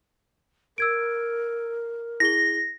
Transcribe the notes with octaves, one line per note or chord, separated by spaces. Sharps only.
A#4 E6 G#6 D7
E4 G#4 A#6 G7